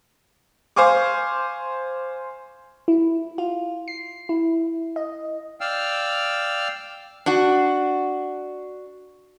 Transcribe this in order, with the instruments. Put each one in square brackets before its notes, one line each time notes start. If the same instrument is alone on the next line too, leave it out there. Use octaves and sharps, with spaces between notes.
[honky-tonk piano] C5 F5 G#5 C#6 D6
[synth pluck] E4
F4
C7
E4
D#5
[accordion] D5 F5 G5 E6 F6
[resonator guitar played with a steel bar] D4 F#4